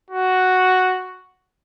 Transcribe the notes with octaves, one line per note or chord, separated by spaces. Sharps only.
F#4